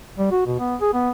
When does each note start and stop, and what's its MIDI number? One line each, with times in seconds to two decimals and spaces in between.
0.18 0.31 55
0.31 0.43 66
0.46 0.55 47
0.59 0.76 59
0.81 0.92 68
0.93 1.11 59